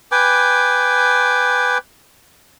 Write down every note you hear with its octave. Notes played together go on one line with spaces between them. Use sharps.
B4 G5 G#5 D6